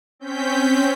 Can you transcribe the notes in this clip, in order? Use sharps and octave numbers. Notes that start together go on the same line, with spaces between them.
C4 C#4 G6 B6